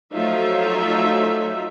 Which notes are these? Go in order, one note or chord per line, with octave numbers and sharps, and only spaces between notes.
F3 F#3 A3 D#4 F4 E5